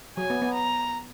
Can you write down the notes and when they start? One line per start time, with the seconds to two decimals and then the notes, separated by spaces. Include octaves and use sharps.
0.17 F#3 G#5
0.30 B3
0.42 B3
0.53 A#5